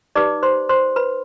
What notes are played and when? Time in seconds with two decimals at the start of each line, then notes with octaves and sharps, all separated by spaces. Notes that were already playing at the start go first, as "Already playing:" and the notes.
0.15 D#4 G4 B4 D5 D6
0.43 C5 C6
0.69 C5 C6
0.96 B4 B5